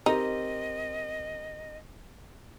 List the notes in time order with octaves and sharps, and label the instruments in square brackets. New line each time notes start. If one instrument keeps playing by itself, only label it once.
[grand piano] C4 G4 A#4 [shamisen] D#4 [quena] D#5